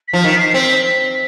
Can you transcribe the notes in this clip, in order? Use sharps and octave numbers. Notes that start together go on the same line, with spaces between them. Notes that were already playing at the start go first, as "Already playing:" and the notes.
B6
F3
D#3 B6
C7
C7
C4 B6